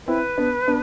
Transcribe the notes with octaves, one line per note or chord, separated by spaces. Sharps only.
C4 E4 B4
B3 D4
B3 D4